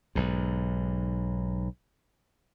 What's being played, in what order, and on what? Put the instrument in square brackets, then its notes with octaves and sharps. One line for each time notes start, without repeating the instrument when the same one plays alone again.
[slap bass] B1 G#2